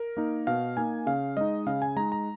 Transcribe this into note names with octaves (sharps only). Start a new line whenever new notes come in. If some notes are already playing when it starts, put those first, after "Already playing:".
Already playing: A#4
A#3 D#4
B2 F5
A#3 D#4 G#5
C#3 F5
G#3 D#4 D#5
C#3 F5
G#5
G#3 D#4 A#5
A#5